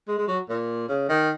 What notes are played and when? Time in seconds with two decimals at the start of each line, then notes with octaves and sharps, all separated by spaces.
0.08 G#3
0.18 G#3
0.28 F#3
0.49 A#2
0.88 C#3
1.09 D#3